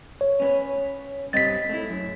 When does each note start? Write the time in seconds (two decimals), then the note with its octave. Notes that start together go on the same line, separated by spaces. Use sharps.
0.21 C#5
0.40 B3 C#4
1.33 G2 C4 D#5 A6 B6
1.69 A3 E4
1.90 F#2